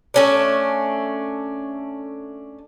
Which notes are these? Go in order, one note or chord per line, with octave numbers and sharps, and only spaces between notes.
A3 C#4 D4